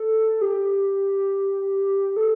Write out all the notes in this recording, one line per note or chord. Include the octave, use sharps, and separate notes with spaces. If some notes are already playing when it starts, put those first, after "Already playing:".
Already playing: A4
G4
A4